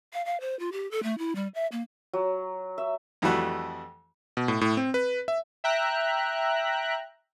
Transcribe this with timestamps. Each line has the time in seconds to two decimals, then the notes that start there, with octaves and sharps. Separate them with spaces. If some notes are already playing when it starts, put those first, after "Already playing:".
0.13 F5
0.25 F5
0.41 C5
0.59 F4
0.72 G4
0.91 A4
1.03 A3
1.18 E4
1.35 G3
1.55 E5
1.72 A#3
2.13 F#3
2.78 E5
3.22 F2 E3 G3 A3 F#4
4.37 B2
4.48 A2
4.61 A2
4.77 C4
4.94 B4
5.28 E5
5.64 E5 G5 A#5 F#6